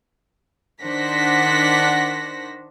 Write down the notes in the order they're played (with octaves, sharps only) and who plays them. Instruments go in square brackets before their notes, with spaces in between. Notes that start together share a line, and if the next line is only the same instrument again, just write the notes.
[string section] D#3 D4 C5 F#5 A#6 B6